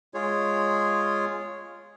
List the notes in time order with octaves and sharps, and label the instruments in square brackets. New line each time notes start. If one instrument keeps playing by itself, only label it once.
[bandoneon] G#3 F4 G#4 C#5